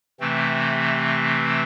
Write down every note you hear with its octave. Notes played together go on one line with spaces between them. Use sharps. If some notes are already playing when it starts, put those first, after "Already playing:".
C3 E3 A3 C4